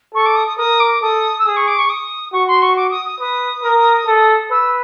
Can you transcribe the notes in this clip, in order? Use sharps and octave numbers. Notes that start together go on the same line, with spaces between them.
A4 C#6
D6
D#6
D#6
A#4 D#6
D6
A4 D#6
E6
G#4 D#6
C#6
D6
C#6
D#6
F#4 C#6
C6
C#6
D6
D#6
D#6
B4 D#6
A#4
A4
B4 E6